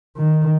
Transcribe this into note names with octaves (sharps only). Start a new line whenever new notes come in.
D#3